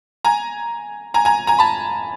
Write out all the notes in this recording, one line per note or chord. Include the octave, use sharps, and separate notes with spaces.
G#5 A#5
G#5 A#5
G#5 A#5
G#5 A#5
A5 B5